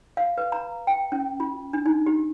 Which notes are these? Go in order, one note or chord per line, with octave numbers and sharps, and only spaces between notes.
F5
B4
A#5
G5
C#4
F4
D4
D#4
G4